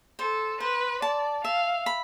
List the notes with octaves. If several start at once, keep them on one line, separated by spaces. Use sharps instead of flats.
A4 C5
B4 C5
D5 A5
E5 F5
B5